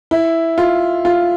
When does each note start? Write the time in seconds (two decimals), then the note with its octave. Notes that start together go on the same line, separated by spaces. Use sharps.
0.11 E4
0.58 F4
1.05 F4